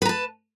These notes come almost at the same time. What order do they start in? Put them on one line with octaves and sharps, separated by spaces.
B4 A#5 A5